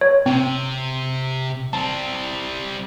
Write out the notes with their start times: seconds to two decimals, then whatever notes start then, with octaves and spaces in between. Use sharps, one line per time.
0.01 C#5
0.26 C3 C4
1.73 G3 C4 A5